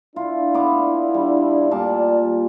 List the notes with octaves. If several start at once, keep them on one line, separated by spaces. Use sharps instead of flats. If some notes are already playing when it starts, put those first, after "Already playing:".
D4 E4 F4
B3 D6
G3
A#2 G3 D5 A5